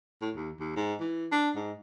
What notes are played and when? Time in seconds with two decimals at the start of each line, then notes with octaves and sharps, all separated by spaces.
0.21 A2
0.35 D#2
0.60 D#2
0.76 G#2
1.00 E3
1.32 D4
1.56 G#2